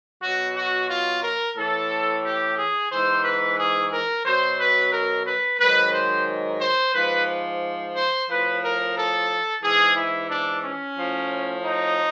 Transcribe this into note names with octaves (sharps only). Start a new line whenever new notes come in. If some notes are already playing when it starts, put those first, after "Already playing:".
B2 F#3 F#4
F#4
F4
A#4
A2 E3 A4
G4
G#4
G#2 E3 C5
B4
G#4
A#4
B2 F#3 C5
B4
A#4
B4
G#2 D#3 F#3 B4
C5
C5
G#2 F3 B4
C5
A2 F3 B4
A#4
A4
G#2 E3 G#4
E4
D4
C#4
A2 F3
D#4